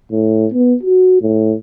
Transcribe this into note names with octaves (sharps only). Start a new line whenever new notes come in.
A2
B3
F#4
A2